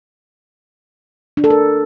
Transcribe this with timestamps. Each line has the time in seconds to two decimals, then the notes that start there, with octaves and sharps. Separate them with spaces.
1.37 D4
1.44 A4
1.50 A#4